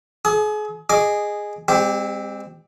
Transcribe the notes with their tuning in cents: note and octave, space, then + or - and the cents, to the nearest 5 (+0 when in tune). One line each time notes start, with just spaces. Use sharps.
G#4 +35 D#6 -30
G#4 -5 D#5 -10 D6 +0
G#3 -40 C4 +0 G4 +0